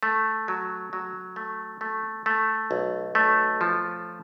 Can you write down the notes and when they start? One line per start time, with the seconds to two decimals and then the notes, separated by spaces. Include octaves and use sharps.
0.03 A3
0.48 F#3
0.93 F#3
1.36 A3
1.81 A3
2.26 A3
2.71 B1
3.15 A3
3.61 F3